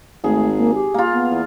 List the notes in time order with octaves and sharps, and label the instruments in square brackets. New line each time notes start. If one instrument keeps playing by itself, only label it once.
[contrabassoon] G#1 [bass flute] A3 [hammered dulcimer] G#4
[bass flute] A#3
G4
[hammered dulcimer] A#3 F4
[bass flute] B3
[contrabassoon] E2